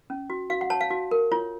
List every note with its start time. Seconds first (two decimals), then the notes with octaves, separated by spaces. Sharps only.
0.10 C#4
0.30 F#4
0.50 F#4 F5
0.61 F#5
0.70 C#5 A5
0.81 F5
0.91 F#4
1.11 A#4
1.32 F4 C#5